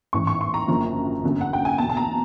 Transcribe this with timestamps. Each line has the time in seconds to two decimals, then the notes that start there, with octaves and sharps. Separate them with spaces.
0.13 A1 G#2 E3 C#6
0.27 C#6
0.41 C6
0.54 A#5
0.68 F#1 F#2 D3 F3
1.23 G1 F#2 D3
1.41 F#5
1.53 G5
1.65 G#5
1.78 E2 B2 A5
1.89 A5
1.97 A#5